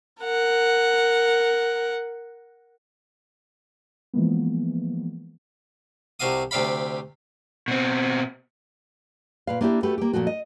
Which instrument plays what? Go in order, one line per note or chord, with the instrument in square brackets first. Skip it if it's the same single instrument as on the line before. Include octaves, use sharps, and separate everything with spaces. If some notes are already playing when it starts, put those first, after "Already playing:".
[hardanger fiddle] A#4 F#5
[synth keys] E3 F3 G#3 A#3 B3
[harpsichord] C2 C3 F#4 F5 D#6
D2 C3 D5 F5 B5
[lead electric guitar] B2 C4
[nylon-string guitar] A#2 B4 F5
A#3 B3 D4 E4 G4
A3 F#4 G4 B4
A#3 G4
A#2 D#3 F3 A3 F#4
D#5